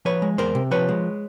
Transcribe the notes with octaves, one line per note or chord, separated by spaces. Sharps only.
F3 B4 C#5
G#3
E2 A#4 C5
C3
F3 B4 C#5
G#3